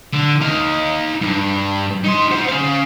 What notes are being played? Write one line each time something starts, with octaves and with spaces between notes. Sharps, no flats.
D3
D#4 F5
G2
D#4 C6
C5 F#5
C#4 F5